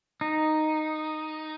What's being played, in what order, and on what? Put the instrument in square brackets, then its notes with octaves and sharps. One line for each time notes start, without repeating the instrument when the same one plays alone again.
[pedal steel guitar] D#4